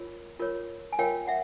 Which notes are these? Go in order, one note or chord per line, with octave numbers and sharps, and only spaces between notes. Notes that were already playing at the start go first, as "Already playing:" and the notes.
Already playing: F4 A#4 C#5
F4 A#4 C#5
G#5
F4 A#4 C#5 F5 G5
E5 F#5